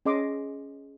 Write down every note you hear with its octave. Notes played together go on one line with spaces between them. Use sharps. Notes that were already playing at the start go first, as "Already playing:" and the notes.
C#4 G#4 D#5 C6 D6